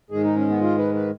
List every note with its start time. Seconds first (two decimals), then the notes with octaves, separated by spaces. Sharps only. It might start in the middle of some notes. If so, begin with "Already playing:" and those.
0.11 G#2 D#3 G#3 G#4
0.24 D#4
0.36 C#4
0.49 B3
0.61 F4
0.78 B4
0.94 B4